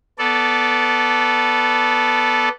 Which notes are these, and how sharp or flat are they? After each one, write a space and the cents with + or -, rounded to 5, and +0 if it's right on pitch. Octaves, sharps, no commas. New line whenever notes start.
B3 -5 A4 -5 D5 -20